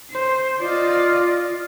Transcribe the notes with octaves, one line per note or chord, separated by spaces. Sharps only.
C5
F4 D5 D#5